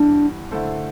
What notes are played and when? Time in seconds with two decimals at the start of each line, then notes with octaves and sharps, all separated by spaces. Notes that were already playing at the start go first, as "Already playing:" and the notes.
Already playing: G2 E3 G3 B3 D4
0.51 D3 A3 E4 A4 C5